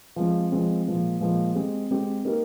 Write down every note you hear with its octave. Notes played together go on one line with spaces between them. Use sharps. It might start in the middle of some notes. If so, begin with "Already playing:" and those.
F3 G#3 C4
F3 G#3 C4
A#2 F3 G#3
A#2 F3 G#3
G#3 C4 G4
G#3 C4 G4
A#3 D#4 G4 A#4